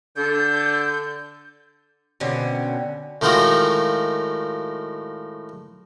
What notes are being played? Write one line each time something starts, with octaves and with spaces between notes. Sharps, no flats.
D3 A4 G6
B2 D3 C4 C#4
A2 D#3 G#3 D#4 F4 F#4